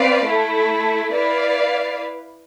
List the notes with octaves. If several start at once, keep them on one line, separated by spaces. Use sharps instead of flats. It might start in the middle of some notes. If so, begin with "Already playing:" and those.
Already playing: C4 B4 D5 F5
A3 E4 A4
E4 B4 D5 F5